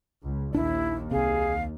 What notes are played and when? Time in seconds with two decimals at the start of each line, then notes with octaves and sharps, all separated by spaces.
0.22 C#2
0.55 A#1 D#2 D4 E4
1.11 C2 C3 G#4 F5